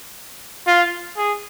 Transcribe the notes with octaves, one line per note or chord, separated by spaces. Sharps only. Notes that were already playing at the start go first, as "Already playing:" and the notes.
F4
G#4